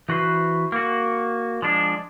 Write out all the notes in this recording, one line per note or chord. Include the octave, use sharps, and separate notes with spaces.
E3 F#4 B4 C5
A#3 F#4
F3 G#3 D4